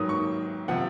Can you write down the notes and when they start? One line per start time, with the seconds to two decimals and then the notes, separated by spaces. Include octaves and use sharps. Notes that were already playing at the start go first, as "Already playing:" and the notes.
Already playing: G#2 D#3 F#3 D#6
0.09 C#6
0.68 C3 F3 F#5